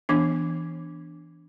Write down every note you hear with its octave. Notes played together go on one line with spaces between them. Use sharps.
E3 B3 D4